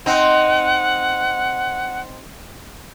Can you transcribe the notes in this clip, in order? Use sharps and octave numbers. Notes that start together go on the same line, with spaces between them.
C4 D#4 F#5